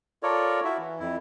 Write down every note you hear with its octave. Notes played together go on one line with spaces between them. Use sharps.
F4 A4 A#4 C#5 D5
E4 F#4 E5
E3
F2 E4